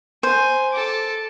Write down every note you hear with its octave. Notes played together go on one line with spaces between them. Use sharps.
C5 G#5
A4 D6